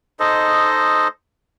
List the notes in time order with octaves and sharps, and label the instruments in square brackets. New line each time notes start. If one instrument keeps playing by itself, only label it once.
[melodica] D#4 A4 C5 D#5